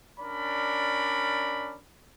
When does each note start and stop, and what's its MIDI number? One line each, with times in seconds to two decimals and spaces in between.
0.20 1.77 61
0.20 1.77 62
0.20 1.77 70
0.20 1.77 74
0.20 1.77 83